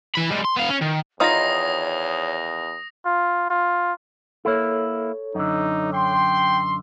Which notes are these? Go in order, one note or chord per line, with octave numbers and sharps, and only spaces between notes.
E3 B5
G3 G#3
C6
B3 F5
C#4
D#3
E2 D#3 D#4 F4 C#5 D#6 A#6
F4
F4
A#3 E4 A4 C#5
F#2 D3 D#4
G5 C6